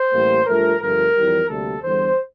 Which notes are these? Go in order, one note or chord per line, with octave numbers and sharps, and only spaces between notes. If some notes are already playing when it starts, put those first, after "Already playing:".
Already playing: C5
A1 A2 G3 A#3
G2 F3 A3 A#4
G1 G2 F3 A3 A#4
F2 E3 G3
D2 C3 G3 A#3 A4
E2 D3 G3 C5